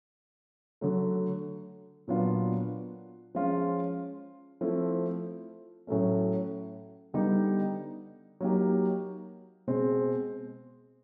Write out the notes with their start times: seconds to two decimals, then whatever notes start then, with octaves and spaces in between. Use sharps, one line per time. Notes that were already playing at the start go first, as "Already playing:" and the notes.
0.81 D3 F#3 A3
2.07 A#2 F#3 B3 D4 F4
3.35 F3 G#3 C#4 F4
4.61 F3 A3 C4 E4
5.87 A2 F#3 A3 C#4
7.14 D3 G3 B3 D#4 G4
8.41 F#3 A#3 D#4 G4
9.67 B2 G#3 C4